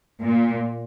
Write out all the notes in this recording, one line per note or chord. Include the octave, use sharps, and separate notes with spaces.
A#2